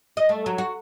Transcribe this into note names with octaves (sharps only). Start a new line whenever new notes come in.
D#5
A3
F#3
F#4